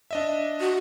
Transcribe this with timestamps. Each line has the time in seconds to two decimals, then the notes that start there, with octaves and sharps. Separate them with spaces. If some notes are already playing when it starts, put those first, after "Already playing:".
0.11 D4 D#5 E5
0.60 F#4